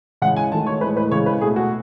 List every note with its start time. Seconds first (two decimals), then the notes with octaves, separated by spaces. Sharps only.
0.22 C#3 E3 G#3 F#5
0.37 G#5
0.52 D#3 F#3 A3 A5
0.67 C#5
0.81 A2 E3 G#3 B4
0.97 B4
1.12 C#3 E3 G#3 C#5
1.26 B4
1.41 B2 A3 G#4
1.56 F#4